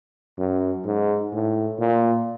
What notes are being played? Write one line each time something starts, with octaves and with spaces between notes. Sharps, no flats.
F#2
G#2
A2
A#2